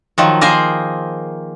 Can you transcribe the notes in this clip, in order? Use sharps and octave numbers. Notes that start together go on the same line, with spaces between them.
D#3 F3 F#3
A#3 G#4 A#4 C5